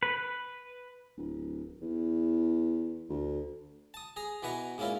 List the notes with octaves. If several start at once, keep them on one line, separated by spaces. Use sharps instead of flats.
B4
D1
E2
D2
A5 D#6
G#4 A#5
B2 E3 B4 G#5 A#5 C#6
G#2 A#3 C#4 E4 F4